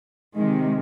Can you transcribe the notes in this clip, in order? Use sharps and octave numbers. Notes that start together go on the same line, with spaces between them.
C3 D#3 G#3